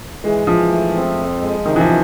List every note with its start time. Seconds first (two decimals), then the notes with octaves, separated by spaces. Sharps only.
0.24 E3 G#3
0.47 E3 F3
0.72 A3
0.95 C4
1.18 F2
1.41 G#3
1.65 C3 D#3
1.76 E3
1.80 F3
1.88 D#3